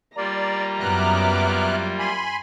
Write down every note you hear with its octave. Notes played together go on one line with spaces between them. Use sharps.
G3 A#3 F4 D5 A#5
F#2 B3 E5 D6 F6 F#6
G#5 B5 C6